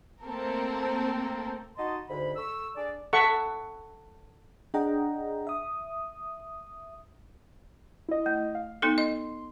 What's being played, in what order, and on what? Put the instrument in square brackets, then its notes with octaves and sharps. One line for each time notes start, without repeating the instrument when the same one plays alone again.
[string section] A3 A#3 C4 A4 A#4
[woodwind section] D#4 F#4 D#5 A5 C6
D2 G#2 D3 B5
A4 C#6 E6
D4 G#4 D5
[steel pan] A4 E5 F#5 C#6
[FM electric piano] D4 G#4 D#5 F#5 G5 A#5
E5 D#6
[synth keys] E4 D#5
[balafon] A3
[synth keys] F5
[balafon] B3 D#4 A4
[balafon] D#5 [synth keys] C6